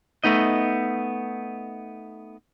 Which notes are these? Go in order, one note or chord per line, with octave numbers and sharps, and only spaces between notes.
A3 B3 D#4 D#5